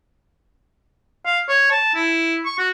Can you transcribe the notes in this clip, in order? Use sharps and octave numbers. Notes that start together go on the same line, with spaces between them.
F5
C#5
A5
E4
C#6
F#4